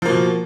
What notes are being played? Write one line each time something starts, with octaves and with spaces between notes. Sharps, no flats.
B2 F3 A#3